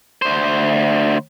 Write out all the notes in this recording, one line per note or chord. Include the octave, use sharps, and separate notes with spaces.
D2 C5